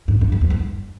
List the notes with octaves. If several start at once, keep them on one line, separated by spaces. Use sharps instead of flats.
G#2
G2
G2
F2
G2